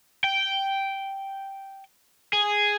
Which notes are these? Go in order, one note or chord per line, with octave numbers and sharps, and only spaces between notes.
G5
G#4